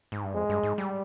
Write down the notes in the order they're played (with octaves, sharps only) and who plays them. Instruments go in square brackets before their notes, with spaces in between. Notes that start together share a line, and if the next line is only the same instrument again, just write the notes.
[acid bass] G#2
G2
[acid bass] F2 [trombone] G#3
[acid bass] G2
G#2
G3